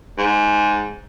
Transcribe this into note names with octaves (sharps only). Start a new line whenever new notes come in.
G#2